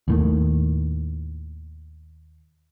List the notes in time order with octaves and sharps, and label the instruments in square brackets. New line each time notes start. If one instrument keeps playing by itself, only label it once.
[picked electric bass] D#2 A2 D#3